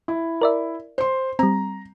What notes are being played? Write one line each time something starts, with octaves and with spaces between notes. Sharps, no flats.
E4
A#4 D5 E5
C5 C6
G3 C4 A#5